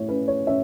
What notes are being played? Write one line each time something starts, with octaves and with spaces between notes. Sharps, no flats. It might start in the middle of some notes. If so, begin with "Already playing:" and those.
Already playing: A2 C#5
C#4 B4
C#5
C#4 E5